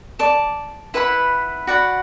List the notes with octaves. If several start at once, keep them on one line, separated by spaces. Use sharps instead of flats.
D5 A5 D6
E4 B4 F#5 B5
F#4 D5 F#5 B5